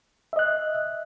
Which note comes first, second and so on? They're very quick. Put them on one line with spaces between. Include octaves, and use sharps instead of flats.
E5 D#5 F#6